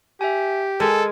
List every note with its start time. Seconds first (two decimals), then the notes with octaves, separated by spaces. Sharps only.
0.21 G4 E5 G#5
0.80 G#3 A4 A#4 G#5 G#6